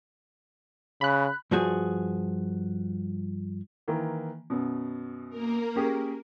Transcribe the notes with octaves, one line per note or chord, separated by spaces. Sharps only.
C#3 B5 F#6
G2 F3 F#4 G#4
D#3 E3 A#3
F#2 B2
A#3 A#4
C#4 G4 G#4